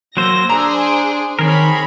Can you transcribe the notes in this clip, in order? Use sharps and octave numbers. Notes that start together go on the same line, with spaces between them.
F#3 A#3 C5 E6 A#6
D4 G#4 C5 A#5
D7
D#3 C4 G#4 A#4 C#5 B5